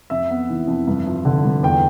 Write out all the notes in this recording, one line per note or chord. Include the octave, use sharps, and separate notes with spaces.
F2 E5
B3
E3
F2
G2
F3
D3
G2
E2 G5